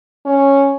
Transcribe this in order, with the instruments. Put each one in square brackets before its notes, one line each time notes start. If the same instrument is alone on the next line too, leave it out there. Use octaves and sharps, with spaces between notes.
[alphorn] C#4